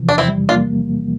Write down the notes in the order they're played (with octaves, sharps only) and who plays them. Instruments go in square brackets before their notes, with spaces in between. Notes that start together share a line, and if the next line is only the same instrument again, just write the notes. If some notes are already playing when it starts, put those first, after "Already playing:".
Already playing: [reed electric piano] C3 E3 F3
[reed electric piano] E2 [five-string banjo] D4
[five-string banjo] C4 E4
[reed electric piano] G3
[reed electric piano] A#3 [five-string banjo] D4 F4